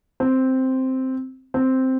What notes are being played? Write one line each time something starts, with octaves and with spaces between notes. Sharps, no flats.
C4
C4